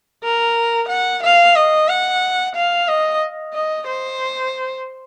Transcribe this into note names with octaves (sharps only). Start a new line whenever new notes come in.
A#4
F#5
F5
D#5
F#5
F5
D#5
D#5
C5